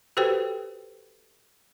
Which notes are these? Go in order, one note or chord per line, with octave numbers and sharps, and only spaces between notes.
F#4 G4 A4 B4 C5 G5